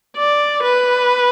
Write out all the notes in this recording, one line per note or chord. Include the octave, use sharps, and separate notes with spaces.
D5
B4